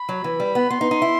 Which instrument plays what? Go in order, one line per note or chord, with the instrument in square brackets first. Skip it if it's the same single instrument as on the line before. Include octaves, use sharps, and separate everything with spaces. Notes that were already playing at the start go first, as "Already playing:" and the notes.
Already playing: [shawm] B5
[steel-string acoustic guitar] F#3
E3
G3
B3
[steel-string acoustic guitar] B3 [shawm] C6
[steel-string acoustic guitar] D#4
D#4
E4